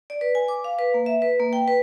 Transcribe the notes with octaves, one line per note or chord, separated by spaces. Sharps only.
D5
B4
G#5
D6
F5
B4
A#3
E5
B4
A#3
G5
B4